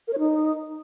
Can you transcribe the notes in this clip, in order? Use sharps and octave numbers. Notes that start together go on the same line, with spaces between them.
A#4
C#5
D#4